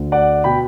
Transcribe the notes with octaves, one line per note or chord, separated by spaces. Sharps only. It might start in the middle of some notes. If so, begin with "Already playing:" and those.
Already playing: D2 D3
D5 F#5
B2 G5 B5